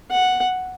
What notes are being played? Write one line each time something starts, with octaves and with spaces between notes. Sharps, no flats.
F#5